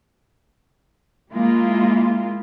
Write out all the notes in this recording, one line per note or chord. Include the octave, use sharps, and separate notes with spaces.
G#3 A#3 E4 F4